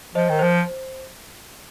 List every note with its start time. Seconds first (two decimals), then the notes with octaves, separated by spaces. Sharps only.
0.15 F3 C5 D#5
0.29 D#3 A#4
0.39 F3 C5